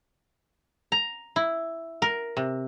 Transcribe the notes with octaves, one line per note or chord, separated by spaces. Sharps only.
A#5
E4
A#4
C3